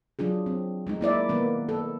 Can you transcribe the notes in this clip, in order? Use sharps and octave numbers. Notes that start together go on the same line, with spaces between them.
F#3 D4 F4 G#4
C4
G#3 A3 D#4
A#3 E4 D5 E5
D#3 A#3 B3
A4